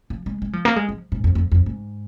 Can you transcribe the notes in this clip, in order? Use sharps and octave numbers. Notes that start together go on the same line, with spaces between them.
F3
G#3
G#3
F3
A#3
G#3
F3
G#2
F2
F2
F2
G#2